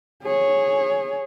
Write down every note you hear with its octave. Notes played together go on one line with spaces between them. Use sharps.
G#4 C#5